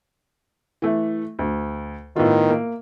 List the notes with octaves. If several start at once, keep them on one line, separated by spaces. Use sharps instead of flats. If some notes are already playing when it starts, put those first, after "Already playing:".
E3 A3
D2
A2 D#3 B3 F4
A#3